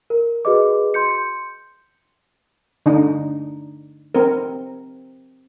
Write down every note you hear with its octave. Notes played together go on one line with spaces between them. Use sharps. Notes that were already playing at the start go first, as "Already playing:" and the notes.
A#4
F#4 G#4 B4 D#5 D6
C6 G6 C#7
D3 D4 D#4
C4 A#4